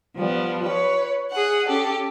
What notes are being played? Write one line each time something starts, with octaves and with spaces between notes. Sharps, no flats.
F3 G3 B3
B4 C#5
G#4 F#5
C#4 G4 A4